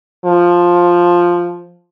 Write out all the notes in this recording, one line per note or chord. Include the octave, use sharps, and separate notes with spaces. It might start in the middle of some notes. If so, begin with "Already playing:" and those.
F3